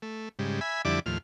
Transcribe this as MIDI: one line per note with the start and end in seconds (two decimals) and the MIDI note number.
0.02 0.29 57
0.39 0.60 44
0.39 0.60 49
0.39 0.60 55
0.61 0.82 76
0.61 0.82 80
0.61 0.82 83
0.85 1.00 41
0.85 1.00 50
0.85 1.00 55
0.85 1.00 64
0.85 1.00 74
0.85 1.00 86
1.06 1.18 39
1.06 1.18 45
1.06 1.18 53
1.06 1.18 89